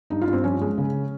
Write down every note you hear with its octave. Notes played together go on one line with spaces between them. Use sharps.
G2 D#4
F4
G2
C4
F3 C#4
G#3
C#3